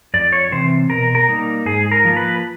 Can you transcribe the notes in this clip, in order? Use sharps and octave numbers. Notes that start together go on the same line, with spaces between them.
F2 D5
C#5
C3 E3 C4 C5
B2 A#4
A#4
G3 A#3 D#4
G#2 G#4
A#4
F3 A#3
B4